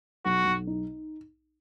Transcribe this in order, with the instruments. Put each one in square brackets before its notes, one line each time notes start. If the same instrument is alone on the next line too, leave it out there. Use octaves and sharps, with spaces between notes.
[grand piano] B1 [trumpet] F#4
[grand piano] B1
D#4